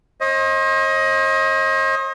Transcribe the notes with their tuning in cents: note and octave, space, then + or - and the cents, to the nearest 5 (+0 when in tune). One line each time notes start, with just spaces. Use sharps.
C5 +45 D#5 +20